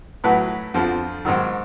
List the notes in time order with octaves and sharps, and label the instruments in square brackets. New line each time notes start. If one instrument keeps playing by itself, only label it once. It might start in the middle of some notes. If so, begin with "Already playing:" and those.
[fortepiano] A2 F#3 B4
F2 D3 F3
G#2 D#3 F#3